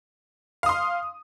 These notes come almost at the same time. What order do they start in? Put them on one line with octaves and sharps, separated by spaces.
F5 D#6 C6